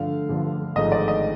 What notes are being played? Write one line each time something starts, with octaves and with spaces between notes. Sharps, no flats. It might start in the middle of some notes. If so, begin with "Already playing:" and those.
Already playing: G2 D3 F3 A3 D4 F5
G2 D3 F3 A3 D4
G#1 G#2 F3 A3 D#5
D5
D#5